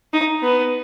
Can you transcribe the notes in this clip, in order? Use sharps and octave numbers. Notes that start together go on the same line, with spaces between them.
D#4
B3